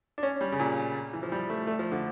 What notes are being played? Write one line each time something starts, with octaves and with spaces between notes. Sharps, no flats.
D4
C#4
G3
C#3
A#2
E3
F3
G3
A3
A3
F3
D3